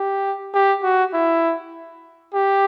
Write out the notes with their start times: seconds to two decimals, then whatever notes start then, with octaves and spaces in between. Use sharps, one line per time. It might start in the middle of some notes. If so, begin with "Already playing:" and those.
Already playing: G4
0.54 G4
0.83 F#4
1.14 E4
2.34 G4